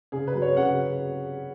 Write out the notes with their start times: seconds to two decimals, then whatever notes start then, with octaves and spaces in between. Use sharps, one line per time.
0.12 C#3 G#4
0.27 B4
0.35 F#3
0.42 C#5
0.57 C#3 F#5